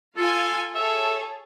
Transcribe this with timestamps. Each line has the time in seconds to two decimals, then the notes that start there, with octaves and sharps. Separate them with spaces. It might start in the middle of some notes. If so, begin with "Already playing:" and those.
0.17 F4 A4 F5 G#5
0.75 G#4 A4 C#5 E5